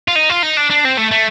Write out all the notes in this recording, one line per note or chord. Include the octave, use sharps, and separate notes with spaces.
F4
D#4
F4
D#4
D4
D4
C4
A3
A3